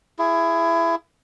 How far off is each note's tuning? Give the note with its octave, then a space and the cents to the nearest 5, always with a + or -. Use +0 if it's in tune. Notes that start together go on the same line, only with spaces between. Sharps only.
E4 +20 G#4 +0